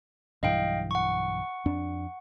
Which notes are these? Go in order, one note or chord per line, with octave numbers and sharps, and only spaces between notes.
B1 G2 E3 D#5 F5 G5
F#5 C#6
F2 D4